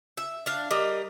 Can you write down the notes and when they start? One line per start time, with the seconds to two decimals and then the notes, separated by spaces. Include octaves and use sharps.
0.17 E5
0.46 D4 F5
0.71 G3 A#3 D#5